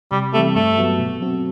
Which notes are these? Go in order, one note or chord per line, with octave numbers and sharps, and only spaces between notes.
C3 G3
E3 G3 A3 C4 G4
G2 A3
F#3 B3 F#4
B2
F#3 C4 F#4